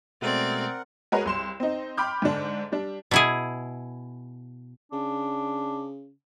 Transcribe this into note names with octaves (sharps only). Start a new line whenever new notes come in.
B2 G#3 A3 C4 A#4 D5 F#5
G#3 F#4 G#4 A#4 B4 C#5
C2 C6 E7
C4 D#4
G5 B5 C6 D6 F6 G6
G#2 D3 D4
G3 D4
B2 E4 G#4
C#3 D4